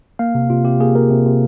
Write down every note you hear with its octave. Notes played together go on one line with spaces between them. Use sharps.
A#3 F5
C3
C3 F4
C3 G4
A#3 G#4
A#3 A#4
C3
C3